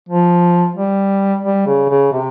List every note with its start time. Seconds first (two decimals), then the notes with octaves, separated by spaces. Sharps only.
0.09 F3
0.76 G3
1.44 G3
1.67 C#3
1.89 C#3
2.13 C3